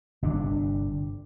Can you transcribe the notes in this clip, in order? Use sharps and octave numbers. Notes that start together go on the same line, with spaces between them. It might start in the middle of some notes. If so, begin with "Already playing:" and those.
G1 C3 D4